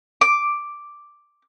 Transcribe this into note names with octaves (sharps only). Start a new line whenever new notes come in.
D6